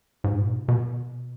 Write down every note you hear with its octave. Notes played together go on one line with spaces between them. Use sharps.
G#2
A#2
B2
B2